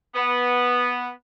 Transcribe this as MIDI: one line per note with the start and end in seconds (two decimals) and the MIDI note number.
0.15 1.09 59